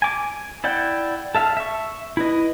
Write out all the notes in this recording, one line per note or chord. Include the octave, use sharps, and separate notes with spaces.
G#5 D6
E4 D5 F#5 G5
A4 E5 F5
E5 C#6
E4 B4 D#5